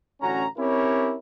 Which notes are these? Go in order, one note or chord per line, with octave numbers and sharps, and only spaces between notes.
A1 D3 C#4 F#4 A#5
C4 C#4 E4 G4 A#4 C#5